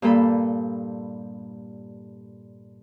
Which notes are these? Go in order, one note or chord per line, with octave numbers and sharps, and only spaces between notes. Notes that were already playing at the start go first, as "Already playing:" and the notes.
G2 A#2 A#3 A4 B5